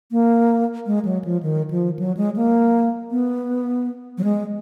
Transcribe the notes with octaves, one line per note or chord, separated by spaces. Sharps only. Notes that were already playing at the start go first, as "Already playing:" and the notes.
A#3
G#3
F#3
F3
D#3
F3
F#3
G#3
A#3
B3
F#3
G#3